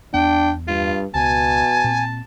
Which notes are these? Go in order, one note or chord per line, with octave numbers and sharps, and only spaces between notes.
E2 B3 D4 G5
G2 F4
C#2 B2 G#5 A5
A#2 C4